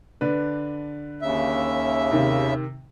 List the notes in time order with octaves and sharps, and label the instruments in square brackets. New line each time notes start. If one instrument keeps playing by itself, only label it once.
[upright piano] D3 D4 B4
[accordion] D#2 C#3 E5
[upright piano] C3 D#3